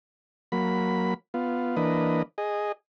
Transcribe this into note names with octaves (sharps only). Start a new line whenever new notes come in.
F#3 A#3 B5
B3 F4
E3 A#3 D4 B4 D#5
G#4 D#5